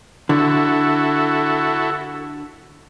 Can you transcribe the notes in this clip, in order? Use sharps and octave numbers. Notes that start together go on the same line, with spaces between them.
D3 E4 F#4 A4